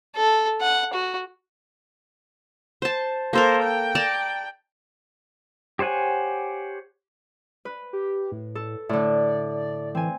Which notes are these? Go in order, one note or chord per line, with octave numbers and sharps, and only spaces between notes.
A4
F#5
F#4
C5 A5
A#3 A4 A#4 C5
G5
D5 A5 A#5
G4 C5 C#5 F#5 G#5
B4
G4
A2
A4
A2 D3 D5
E3 C4 G#5